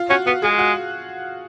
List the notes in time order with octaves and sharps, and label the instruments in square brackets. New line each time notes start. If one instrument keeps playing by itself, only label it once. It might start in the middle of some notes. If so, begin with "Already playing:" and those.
Already playing: [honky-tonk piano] F4
[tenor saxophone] C#4 [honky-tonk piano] F#4
[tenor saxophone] B3 [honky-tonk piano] F#4
[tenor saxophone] G#3 [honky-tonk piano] G#4
[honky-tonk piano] F#4